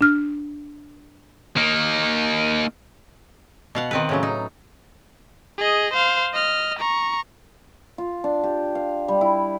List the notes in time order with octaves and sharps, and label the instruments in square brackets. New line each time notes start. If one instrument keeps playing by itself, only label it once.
[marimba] D4 F6
[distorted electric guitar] A#3 D#4
[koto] B2 F5 F#5
D#3 C4 B4
A2 C#3 F#3
D#4
[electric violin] G#4 D#5
C5 F5
D#5 F6
A#5 C#6
[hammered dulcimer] F4
D4
G4
F5
G3
E4